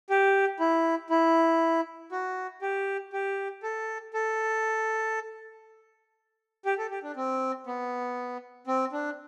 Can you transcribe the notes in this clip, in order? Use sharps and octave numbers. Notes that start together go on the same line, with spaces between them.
G4
E4
E4
F#4
G4
G4
A4
A4
G4
A4
G4
D4
C4
B3
C4
D4